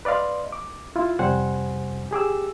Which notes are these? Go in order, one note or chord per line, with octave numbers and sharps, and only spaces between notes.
B4 D5 D#5 F5 C6
D6
E4 F4
F2 C3 G3 C5 F#5 G#5
G4 G#4 D6 E6